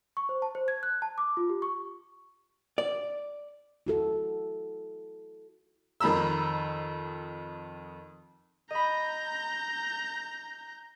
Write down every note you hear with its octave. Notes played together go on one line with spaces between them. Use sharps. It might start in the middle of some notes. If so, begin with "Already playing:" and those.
C#6
C5
A5
C5
G#6
F#6
A5
D6
F4
G4
C#6
D5
E4 F#4 A4
F2 D#3 A#5 B5 E6
D#5 A#5 B5 G6